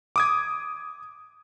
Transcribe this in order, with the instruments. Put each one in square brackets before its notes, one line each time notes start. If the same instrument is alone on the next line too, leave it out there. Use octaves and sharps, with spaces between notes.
[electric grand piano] D6 D#6 G#6